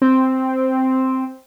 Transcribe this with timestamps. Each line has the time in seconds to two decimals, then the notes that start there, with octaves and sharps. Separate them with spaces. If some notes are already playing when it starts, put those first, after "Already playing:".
0.02 C4